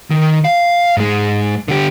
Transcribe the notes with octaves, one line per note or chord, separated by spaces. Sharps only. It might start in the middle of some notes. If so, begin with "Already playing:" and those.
D#3
F5
G#2 G#3
D3 G4